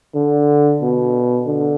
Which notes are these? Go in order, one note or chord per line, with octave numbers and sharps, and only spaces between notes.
D3
B2
D3